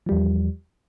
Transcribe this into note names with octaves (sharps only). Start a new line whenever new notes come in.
E2 F3 G3